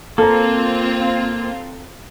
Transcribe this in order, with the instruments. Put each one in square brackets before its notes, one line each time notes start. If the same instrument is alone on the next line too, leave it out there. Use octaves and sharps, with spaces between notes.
[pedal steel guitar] A#3 [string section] C4 F4 [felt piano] A4 A#5